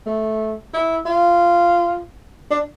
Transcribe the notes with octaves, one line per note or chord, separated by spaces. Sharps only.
A3
E4
F4
D4